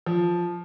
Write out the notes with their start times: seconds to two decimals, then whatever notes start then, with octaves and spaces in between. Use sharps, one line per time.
0.06 F3